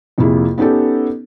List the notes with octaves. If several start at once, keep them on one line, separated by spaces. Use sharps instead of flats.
F2 C3 A#3 E4 G#4
B3 C#4 D#4 G4 A4